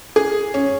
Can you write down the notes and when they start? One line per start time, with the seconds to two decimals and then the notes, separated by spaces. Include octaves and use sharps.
0.16 G#4
0.54 C#4